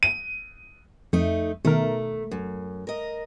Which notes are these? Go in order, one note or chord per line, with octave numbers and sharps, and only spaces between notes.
D#7
F2 A3 D#4
B2 D#3 A3 A#4
F#2
A#4 D#5